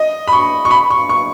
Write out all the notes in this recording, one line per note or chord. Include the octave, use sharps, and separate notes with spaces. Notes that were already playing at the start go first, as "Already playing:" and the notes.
Already playing: D#5
B5
C#6
C#6
B5
C#6
C#6